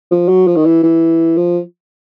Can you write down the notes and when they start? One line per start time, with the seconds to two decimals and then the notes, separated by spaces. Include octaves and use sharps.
0.11 F3
0.28 F#3
0.47 F3
0.56 D#3
0.66 E3
0.83 E3
1.37 F3